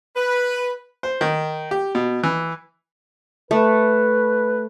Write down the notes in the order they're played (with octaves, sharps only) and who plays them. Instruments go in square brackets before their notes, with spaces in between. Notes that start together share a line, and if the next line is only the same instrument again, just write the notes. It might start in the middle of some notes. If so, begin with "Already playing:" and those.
[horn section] B4
[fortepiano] C5
D#3
G4
B2
E3
[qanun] A3 [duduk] B4